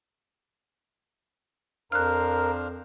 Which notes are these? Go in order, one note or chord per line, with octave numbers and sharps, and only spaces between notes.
F2 D4 A#4 C5 F5 F6 F#6